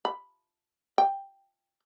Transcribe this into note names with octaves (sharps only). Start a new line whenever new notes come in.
B5
G5